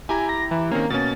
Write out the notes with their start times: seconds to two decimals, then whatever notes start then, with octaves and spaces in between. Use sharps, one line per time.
0.09 E4 G4 G#5 A#5
0.29 A#6
0.51 E3
0.71 D#3 A#3 C4 C#4
0.90 B2 A#3 C#4 A6